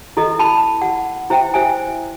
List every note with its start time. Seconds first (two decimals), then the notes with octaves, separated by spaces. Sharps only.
0.17 E4 A4 D#5
0.39 A5 B5
0.82 F#5
1.30 E4 C5 E5 G5
1.54 C5 E5 G#5